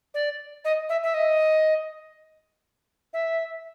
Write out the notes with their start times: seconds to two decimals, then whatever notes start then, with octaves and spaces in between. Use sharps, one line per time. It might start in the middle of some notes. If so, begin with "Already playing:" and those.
0.14 D5
0.64 D#5
0.89 E5
1.03 E5
1.14 D#5
3.13 E5